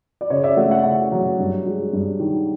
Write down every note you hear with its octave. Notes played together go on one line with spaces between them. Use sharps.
D5
C#3 C#5 D#5
D5 E5
A3 E5 F#5
E5 F#5
C#3 E5 F#5
F#3
G2
G#3
G2
D#3